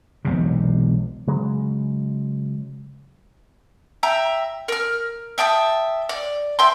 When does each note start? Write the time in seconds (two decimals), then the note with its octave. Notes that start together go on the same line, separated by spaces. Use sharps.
0.25 E1 B1 C3
1.27 C#3 F#3 G#3
4.03 E5 G5 A#5
4.68 A#4 F6
5.38 E5 G5 A5 D#6
6.09 D5
6.59 E5 G5 C6